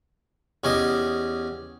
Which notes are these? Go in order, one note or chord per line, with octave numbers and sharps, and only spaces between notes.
E2 C#4 G4 D#5